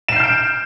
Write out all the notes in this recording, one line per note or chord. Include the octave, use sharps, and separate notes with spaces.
F6 G6 C7 D7 E7